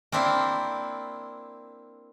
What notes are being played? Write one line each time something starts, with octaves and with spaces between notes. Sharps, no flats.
A#3 C4 D4 E4